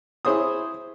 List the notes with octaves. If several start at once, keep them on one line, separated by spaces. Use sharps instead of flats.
E4 G#4 C5 C#5 D#6